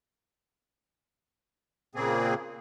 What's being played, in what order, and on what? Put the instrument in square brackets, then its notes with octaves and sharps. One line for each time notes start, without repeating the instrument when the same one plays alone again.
[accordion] A#2 C#3 A#3 C4 G#4